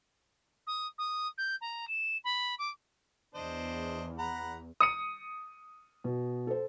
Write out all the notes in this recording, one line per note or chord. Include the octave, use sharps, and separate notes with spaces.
D#6
D#6
G6
A#5
E7
B5
D6
E2 D4 C5 D#5
F#5 A#5 B5
D#6 C#7 D#7
B2
A4 C5